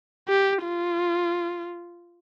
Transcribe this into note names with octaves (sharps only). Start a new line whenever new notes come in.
G4
F4